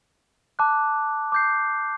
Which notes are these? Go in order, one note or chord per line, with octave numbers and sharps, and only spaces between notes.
A5 D6 F#6
D6 G6 C7